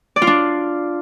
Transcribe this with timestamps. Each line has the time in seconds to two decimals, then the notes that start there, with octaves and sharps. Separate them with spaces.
0.16 D5
0.22 F4
0.27 D4